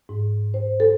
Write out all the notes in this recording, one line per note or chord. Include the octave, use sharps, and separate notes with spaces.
G#2
C5
A4